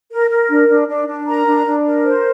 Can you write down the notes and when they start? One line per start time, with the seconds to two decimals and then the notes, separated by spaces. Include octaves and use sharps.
0.11 A#4
0.30 A#4
0.49 D4
0.69 D4
0.88 D4
1.08 D4
1.27 A#4 A#5
1.46 D4
1.66 D4
1.85 A#4
2.05 C5